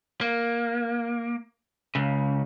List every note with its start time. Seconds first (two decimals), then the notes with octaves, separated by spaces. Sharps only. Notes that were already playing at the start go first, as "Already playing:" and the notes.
0.21 A#3
1.95 C#2 C#3